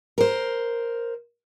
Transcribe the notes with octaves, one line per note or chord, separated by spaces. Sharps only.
A#4 C5